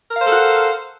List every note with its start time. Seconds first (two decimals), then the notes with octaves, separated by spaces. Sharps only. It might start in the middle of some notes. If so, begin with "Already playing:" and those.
0.11 A#4
0.16 F5
0.21 C5
0.26 A4
0.31 F#5